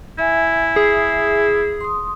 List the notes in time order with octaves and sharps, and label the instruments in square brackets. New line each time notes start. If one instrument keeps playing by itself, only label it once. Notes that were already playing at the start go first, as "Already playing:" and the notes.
[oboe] E4 [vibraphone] E5 G#5
[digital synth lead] G#4
[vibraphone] C6 D#6